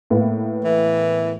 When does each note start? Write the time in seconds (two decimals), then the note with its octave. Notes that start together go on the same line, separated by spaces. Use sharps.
0.10 A2 A#3 B3
0.65 E3